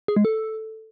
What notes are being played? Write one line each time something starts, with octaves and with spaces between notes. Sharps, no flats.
G#4
G#3
A4